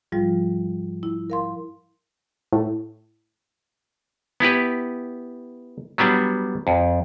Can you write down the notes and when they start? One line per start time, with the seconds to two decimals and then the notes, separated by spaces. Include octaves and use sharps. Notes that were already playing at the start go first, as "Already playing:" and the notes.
0.12 G#2 F3 G3 F4
1.03 E4
1.30 A#4 F5 C6
2.52 A2
4.40 B3 E4 G4 B4
5.98 F#3 G3 B3 D4
6.67 F2